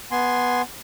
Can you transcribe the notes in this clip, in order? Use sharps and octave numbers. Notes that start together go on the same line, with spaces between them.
B3 G#5 C6